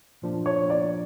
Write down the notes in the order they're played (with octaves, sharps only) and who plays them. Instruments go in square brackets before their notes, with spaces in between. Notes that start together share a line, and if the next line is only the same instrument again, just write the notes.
[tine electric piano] A#2 F3 A#3 D4
[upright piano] C#5
D5